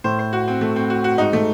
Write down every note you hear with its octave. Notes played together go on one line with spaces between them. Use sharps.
A2 C5
C5
F#4
C4
A3
C4
F#4
F#4
G#2 D#4
A3